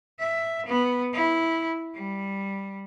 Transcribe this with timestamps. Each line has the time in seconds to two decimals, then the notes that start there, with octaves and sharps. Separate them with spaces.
0.19 E5
0.66 B3
1.13 E4
1.94 G3